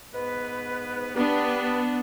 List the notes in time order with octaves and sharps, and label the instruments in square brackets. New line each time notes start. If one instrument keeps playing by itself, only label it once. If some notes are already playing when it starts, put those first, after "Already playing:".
[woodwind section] G#2 B3 B4
[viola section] B3 D4 [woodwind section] G4 B4